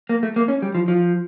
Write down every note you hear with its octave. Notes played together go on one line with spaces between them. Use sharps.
A#3
A3
A#3
C#4
G3
F3
F3